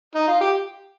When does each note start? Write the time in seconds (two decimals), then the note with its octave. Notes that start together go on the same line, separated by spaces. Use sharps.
0.15 D#4
0.28 F4
0.41 G4